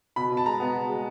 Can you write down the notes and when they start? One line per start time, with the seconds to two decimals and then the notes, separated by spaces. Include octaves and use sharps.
0.16 B2 B5
0.32 B2
0.37 A5
0.46 G#3 A#5
0.60 B3
0.75 B2
0.89 G#3